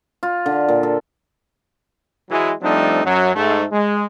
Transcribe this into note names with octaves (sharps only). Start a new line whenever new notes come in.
F4
D3
A#2
A4
E3 F#3 G#3
F3 G3 A3 C4 D4 D#4
F#2 F#3
G#2 A3
G#3